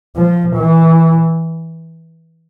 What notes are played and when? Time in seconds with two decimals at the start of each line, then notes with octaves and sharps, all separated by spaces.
0.16 F3
0.57 E3